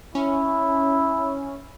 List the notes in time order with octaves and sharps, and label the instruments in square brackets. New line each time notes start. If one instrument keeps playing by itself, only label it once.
[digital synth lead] C#4 [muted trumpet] E4